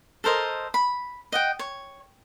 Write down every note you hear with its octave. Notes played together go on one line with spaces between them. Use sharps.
A4 A#4 C5 D#5
B5
D#5 F#5 G5
C#5